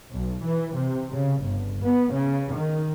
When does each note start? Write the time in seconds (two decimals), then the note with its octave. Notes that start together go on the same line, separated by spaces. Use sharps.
0.12 B1
0.42 E3
0.75 C3
1.12 C#3
1.41 G1
1.82 B3
2.13 C#3
2.54 D#3